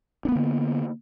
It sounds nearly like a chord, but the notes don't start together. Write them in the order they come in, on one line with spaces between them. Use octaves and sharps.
D4 B3 A#3 D3